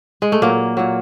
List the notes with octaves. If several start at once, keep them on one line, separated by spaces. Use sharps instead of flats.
G#3
A3
A#2 F#3 A#3
A#2 F#3